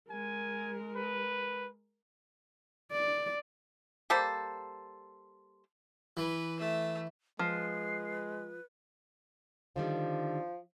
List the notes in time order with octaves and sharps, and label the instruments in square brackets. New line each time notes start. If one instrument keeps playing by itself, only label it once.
[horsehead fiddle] G#3 A#4 [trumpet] G#5
[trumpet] B4
[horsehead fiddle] D5
[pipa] G3 A#3 A4 C5
[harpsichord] E3 [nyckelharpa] B4
[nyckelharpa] A3 E5
[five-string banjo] F3 [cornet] G#3 [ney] B4 [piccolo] C7
[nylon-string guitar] D3 D#3 G3 [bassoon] F3